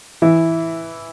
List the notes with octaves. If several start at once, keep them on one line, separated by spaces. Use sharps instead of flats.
E3 E4